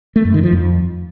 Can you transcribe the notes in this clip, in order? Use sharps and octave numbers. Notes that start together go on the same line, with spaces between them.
A3
F#2
D#3
F3
F2